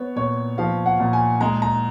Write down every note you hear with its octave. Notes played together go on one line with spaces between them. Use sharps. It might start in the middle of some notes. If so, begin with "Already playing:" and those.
Already playing: B3 C#5
A#2 C#5
F3 F5
F#5
A#2
G#5
G#3 A#5
A#5